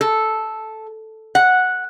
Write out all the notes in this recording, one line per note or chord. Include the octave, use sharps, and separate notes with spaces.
A4
F#5